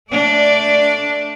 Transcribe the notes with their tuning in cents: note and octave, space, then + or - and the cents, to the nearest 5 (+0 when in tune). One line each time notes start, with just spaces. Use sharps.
A3 +0 D4 -10 D5 +0